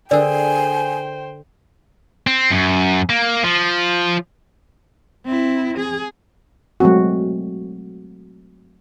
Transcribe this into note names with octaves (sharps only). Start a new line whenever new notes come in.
D3 G#4 A#4 C5 D5 G5 G#5
C4
F#2
A#3
F3
C4 E4
G#4
F#3 G#3 A3 C4 F#4